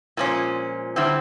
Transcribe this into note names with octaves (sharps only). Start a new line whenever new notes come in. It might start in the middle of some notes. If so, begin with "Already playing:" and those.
A#2 F3 G#3 C#4
D3 G3 C4 E4